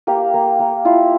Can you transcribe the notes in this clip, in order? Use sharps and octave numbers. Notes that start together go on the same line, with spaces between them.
A#3 G4
A#3
A#3
E4 F4